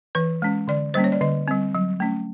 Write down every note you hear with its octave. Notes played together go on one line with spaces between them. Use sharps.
E3 B4
G#3 C#4
D3 D5
G3 A#3 C#4 C5
C#5
D5
D3 D#5
G3 C4
F#3
A3 C#4